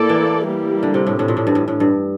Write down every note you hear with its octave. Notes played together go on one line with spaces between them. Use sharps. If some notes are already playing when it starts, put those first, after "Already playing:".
Already playing: A2 A#3 E4 A4 D5
E3
G3 A#3 E4 G4
D3
C3
A2
A2 E3 A3 D4
A#2
A2
G2
A2
A2
G2